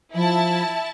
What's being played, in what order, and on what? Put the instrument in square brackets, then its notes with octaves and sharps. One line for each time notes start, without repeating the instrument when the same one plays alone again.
[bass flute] F3 [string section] E4 A5